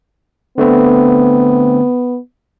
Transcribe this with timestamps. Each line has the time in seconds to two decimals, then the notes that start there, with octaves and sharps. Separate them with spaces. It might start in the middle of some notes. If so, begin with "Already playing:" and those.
0.58 D3 A3 B3 C4